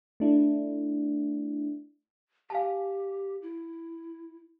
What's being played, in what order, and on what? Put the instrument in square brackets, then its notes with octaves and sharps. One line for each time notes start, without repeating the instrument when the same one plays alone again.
[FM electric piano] A3 D4 E4
[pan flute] G4 [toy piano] F5 G#5 A5
[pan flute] E4